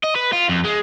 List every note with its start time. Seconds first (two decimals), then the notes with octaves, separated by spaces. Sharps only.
0.03 D#5
0.15 B4
0.32 F4
0.49 F2
0.64 G#3